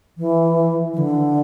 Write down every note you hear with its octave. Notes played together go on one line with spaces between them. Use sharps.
E3
E3
D3